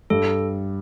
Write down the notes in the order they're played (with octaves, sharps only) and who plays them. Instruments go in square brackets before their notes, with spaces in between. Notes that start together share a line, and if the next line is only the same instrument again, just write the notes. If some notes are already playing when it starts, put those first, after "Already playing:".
[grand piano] G2 [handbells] A4